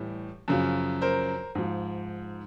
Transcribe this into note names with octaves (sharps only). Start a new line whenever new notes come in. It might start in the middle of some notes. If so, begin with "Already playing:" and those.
Already playing: A2 E3 G3
F#2 C#3 F3
A#4 C5
G#2 F3